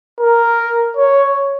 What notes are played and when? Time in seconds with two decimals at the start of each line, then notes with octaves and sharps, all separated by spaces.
0.20 A#4
0.97 C#5